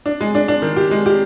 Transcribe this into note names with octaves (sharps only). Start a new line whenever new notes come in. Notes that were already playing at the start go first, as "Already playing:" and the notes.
D4
G#3
D4
D4
D#3
G4
G#3
G4